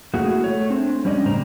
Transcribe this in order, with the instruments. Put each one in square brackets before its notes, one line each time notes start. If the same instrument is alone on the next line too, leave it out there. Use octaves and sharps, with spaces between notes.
[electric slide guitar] A3 A#3 E4 F#4 G#4
A3 C#5
C4 D4
G3 C#4 D5 D#5
A2 C#3 G3 C5 A#5